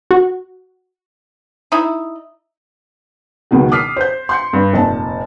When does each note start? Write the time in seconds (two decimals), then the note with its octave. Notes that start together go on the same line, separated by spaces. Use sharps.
0.11 F#4
1.72 D#4 E4
3.51 C#2 B2 D#3 F#3
3.72 D6 D#6 F6 B6 C7
3.96 C5 G6
4.29 C6 G6 C#7
4.53 G2
4.73 F1 A#2 A5